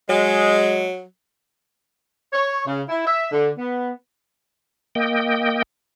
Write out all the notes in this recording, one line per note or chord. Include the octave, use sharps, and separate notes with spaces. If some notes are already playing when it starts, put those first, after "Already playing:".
F#3 G#3
C#5
C#3
E4
E5
D3
B3
A#3 D#5 G5